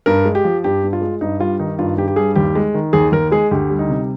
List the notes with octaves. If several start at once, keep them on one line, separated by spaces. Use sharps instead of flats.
G2 A#4
G#3
G4
F3
G2 G4
G2
F4
G#3
G2 D#4
G3 F4
D#3 D#4
G2 F4
G2 G4
G4
G3 G#4
D#2 G4
G#3
D#3
D#2 G#4
D#2 A#4
G#3 G#4
D2 G4
G3
D#4
C3